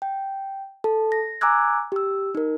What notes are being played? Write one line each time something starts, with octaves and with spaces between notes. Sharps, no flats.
G5
A4 A5
A#6
G#5 A#5 D6 E6 F#6 G#6
G4 E6
D#4 A#4